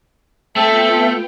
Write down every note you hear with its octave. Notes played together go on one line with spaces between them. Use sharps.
A3 B3 C4 F4 A4 E5 G5